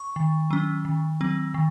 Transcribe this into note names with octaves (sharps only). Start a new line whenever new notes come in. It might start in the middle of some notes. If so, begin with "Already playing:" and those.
Already playing: C#6
D#3
F#3 C#4
D#3
F#3 C4
D#3